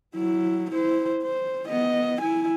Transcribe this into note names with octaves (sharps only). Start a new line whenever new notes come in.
F#3 E4
E4 C5
C5
B3 D#5
E4 G#5